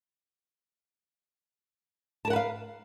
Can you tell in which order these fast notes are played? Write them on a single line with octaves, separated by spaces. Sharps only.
A5 A#4 F#5 B4 F5